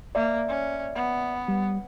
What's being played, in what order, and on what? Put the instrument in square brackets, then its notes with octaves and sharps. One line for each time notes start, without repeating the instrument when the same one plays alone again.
[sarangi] A#3 [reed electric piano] D5 E5
[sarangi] C#4
B3
[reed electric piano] G3